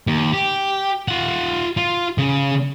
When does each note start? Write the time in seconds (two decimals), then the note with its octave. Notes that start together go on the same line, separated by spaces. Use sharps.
0.07 D#2
0.33 G4
1.08 F4 F#5
1.77 F4
2.18 C#3